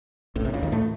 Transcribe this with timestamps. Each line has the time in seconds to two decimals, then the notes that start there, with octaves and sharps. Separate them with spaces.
0.36 A1 A2
0.45 C2 C3
0.53 C#2 C#3
0.63 D#2 D#3
0.72 A2 A3